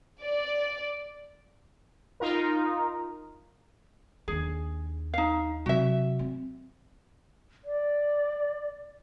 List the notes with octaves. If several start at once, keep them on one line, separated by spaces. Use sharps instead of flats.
D5
D#4 F4 A#4
D#2 D4 G#4
D#4 F5
C3 F#3 F#4 E5
C4
D5